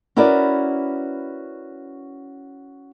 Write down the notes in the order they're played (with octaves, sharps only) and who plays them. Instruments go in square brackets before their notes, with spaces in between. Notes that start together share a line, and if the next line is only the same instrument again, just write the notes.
[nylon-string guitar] C#4 E4 F#4 A#4 B4 D5